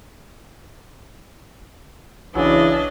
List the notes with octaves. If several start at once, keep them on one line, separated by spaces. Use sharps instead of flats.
B1 C#3 E3 F#3 D4 D#5